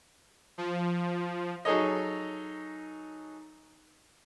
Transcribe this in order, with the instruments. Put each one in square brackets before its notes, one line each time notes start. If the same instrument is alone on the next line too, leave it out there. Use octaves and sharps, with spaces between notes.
[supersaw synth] F3
[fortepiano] F#3 D#4 G#4 A4 C#5 D#5